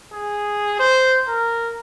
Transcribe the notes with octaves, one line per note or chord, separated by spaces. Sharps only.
G#4
C5
A#4